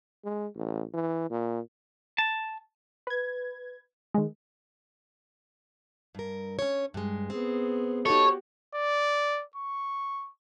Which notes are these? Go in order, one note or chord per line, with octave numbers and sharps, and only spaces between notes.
G#3
A1
E3
A#2
A5
B4 G#6
D#3 G#3
G2 A#4
C#4 C#5
G2 G#3
B3 C4 G#4
D#4 F#4 G4 A4 C#5
D5
C#6